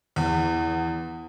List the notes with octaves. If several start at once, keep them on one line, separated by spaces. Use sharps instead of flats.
E2